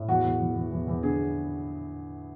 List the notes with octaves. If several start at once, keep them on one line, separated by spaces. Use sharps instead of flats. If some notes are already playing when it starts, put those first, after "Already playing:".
Already playing: A2
E2 F#4
E2
E2
E2
E2
E2
D3 G#4